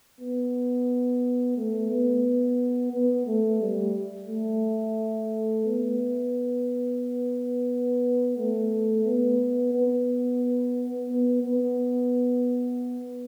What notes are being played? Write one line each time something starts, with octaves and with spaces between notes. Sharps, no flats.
B3
A3
B3
B3
A3
G3
A3
B3
A3
B3
B3
B3
B3